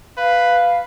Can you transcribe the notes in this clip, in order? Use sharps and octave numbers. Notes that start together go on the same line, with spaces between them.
B4 F5